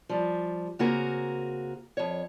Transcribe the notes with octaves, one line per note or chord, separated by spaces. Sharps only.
F3 G3
C#3 A#3 C4 F#4 G#4 A#4
F2 C#5